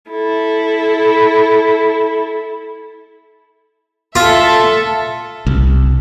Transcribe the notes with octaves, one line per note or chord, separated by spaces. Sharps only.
E4 A4
F4 A4 E5
C2